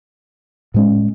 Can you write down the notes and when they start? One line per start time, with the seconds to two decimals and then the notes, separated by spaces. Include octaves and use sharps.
0.74 A2 G#3 C#4